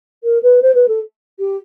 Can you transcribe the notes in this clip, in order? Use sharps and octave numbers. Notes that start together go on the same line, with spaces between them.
A#4
B4
C5
B4
A4
G4